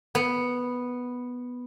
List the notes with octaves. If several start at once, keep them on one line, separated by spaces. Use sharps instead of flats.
B3